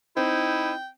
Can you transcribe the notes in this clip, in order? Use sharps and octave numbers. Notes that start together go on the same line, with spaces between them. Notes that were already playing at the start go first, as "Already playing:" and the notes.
C4 D#4 E4 C5 G5